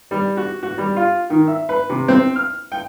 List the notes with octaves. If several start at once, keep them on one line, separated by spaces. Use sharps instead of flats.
G3
F#4
F#4
G3
F4
D#3
E5
B4
C3
C4
F6
G5